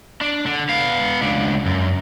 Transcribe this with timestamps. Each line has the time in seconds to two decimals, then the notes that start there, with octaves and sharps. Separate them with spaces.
0.21 D4
0.46 D3
0.69 B3 F5
1.21 C#2 D4
1.66 F#2